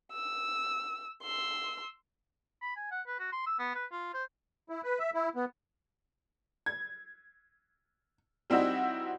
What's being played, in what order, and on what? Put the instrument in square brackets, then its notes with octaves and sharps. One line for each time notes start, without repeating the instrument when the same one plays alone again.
[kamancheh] E6
C6 E6
[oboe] B5
G#5
F#5
B4
F#4
C6
E6
B3
B4
F4
C5
[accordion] E4
B4
E5
E4
B3
[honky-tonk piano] G#6
G3 C4 D#4 E4 F#4